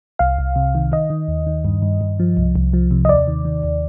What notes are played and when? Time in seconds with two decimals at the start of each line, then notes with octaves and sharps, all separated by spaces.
0.19 C2 F5
0.39 C2
0.56 C3
0.75 D#3
0.92 D#3 D#5
1.10 D#3
1.28 D#2
1.47 D#3
1.65 G2
1.82 G2
2.01 G2
2.20 F3
2.37 C2
2.56 C2
2.73 F3
2.91 C3
3.05 D#5
3.09 D#2 D5
3.28 D#3
3.45 D#3
3.63 D#2